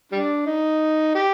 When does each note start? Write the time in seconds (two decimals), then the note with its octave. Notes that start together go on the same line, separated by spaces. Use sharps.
0.12 G3 D4
0.46 D#4
1.15 G4